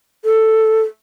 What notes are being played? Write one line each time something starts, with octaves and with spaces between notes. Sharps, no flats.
A4